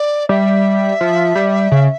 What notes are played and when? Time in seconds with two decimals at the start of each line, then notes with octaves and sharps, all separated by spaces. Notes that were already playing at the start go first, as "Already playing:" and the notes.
Already playing: D5
0.29 G3 E5
1.01 F3
1.35 G3
1.71 C#3